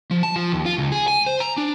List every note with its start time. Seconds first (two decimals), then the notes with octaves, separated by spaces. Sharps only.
0.11 F3
0.23 A5
0.36 F3
0.52 D#2
0.66 F4
0.78 C#2
0.92 G#4
1.08 G#5
1.27 C5
1.40 A#5
1.58 D4